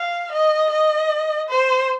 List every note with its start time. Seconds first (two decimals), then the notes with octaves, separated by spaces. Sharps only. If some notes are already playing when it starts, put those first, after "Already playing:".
Already playing: F5
0.32 D#5
0.70 D#5
1.49 C5